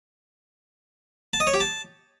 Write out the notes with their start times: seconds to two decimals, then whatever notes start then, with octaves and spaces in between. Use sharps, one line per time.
1.33 A5
1.40 D#5
1.47 C#5
1.54 G4
1.60 A5